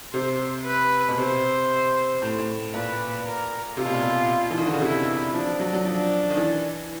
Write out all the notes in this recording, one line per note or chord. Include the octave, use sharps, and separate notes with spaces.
C3 C5
B4
B2
C3 C5
A2
A2
A#2 B4
A#4
C3 F4
B2
A#2
B2
E3
D#3
D3
C#3
C3 E4
F3 D4
F3
F#3
F#3
F3 D4
D#3
E3